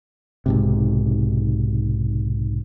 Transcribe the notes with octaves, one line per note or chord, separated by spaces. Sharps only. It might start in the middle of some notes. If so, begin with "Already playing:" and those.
B1 G#2 C3